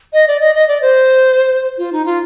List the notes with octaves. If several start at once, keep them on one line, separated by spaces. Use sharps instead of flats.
D#5
D5
D#5
D#5
D5
C5
F4
D#4
F4